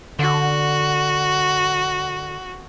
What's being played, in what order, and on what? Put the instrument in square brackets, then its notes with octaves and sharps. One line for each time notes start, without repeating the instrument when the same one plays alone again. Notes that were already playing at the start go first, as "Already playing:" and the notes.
[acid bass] D3 [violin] F#4